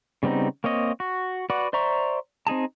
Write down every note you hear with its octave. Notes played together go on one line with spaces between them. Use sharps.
C#3 G3 B3 C4 D#4
A#3 C4 C#5 D#5
F#4
F#4 B4 D5 F#5
C5 D5 E5 A#5 C#6
C4 D#4 G#4 A5